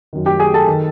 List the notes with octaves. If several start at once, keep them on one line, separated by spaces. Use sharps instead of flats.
F#2 D#3
G4 G5
G#4 G#5
A4 A5
D#3